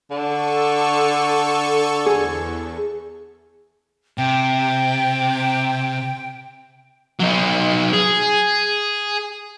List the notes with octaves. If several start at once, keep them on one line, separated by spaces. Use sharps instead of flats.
D3 A4 C#6
E2 G#4
C3 G5
F#3 D#4
G#4